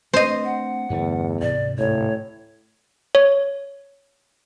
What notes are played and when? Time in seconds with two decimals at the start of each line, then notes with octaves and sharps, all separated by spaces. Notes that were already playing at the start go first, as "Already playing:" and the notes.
0.14 A3 C4 D4 C5 D#5
0.45 F#5
0.90 E2 G2 D3 A3
1.42 D2 G#2 C3 D5
1.78 A2 C#5
3.15 C#5